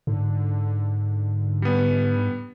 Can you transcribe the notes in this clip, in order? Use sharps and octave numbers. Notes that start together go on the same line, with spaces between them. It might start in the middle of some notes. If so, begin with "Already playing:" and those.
G#2 D3
G3 B3